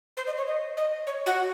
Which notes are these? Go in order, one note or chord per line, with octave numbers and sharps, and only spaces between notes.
C5
D#5
C#5
D#5
D#5
C#5
F#4